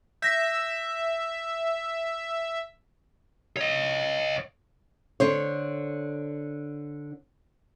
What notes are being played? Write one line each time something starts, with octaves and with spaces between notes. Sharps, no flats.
E5 G6 A#6 B6
C#5 D#5
D3 C5 C#5